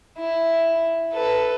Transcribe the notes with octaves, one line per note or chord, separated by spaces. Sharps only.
E4
A4 B4